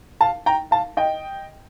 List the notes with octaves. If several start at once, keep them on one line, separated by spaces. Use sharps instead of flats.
F5 A5
G5 A#5
F5 A5
D#5 G5